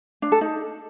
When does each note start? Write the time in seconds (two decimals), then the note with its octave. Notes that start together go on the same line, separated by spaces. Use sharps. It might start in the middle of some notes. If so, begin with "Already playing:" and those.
0.22 D4
0.32 A4
0.41 D#4